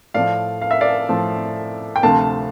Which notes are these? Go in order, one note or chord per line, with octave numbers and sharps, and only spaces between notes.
A2 F3 A3 D5 F5
F5
E5
D5 F5
A2 F3 A3
G5
D2 C3 F3 A3 F5 A5